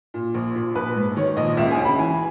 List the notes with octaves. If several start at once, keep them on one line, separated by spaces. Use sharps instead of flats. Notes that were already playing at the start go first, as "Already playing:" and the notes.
A#2
A#1
A#2
A#1 B4
G#2
D#3 C#5
A#1 D#5
C#2 E5
G#5
C#3
B5
E3 G#5